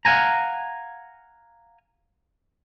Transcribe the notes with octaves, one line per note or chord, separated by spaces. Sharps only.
F5 F#5 G#5 A#5